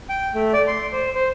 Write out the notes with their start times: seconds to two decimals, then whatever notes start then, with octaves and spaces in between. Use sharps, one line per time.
0.09 G5
0.35 A3
0.53 D5
0.67 C6
0.93 C5
1.15 C5